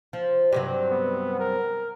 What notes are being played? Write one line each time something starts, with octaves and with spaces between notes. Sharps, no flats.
F3
G2 C3 F#3 G4
B3
A#4